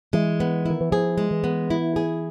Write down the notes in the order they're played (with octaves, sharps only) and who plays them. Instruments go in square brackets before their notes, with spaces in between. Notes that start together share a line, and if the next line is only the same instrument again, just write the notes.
[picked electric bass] E3 [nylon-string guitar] G#3
[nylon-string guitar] B3
[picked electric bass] D#3 [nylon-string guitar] E4
[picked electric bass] E3
[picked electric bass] F3 [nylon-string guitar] G#4
[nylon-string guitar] G#3
[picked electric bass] E3
[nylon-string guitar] B3
E4
G#4